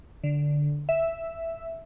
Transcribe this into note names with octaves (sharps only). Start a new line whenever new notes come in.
D3
E5